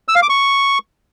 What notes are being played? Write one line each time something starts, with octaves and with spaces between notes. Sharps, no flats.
E6
F5
D6
C#6